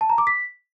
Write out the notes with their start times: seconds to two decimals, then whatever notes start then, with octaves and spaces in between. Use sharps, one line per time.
0.01 A5
0.10 A#5
0.18 D6
0.27 B6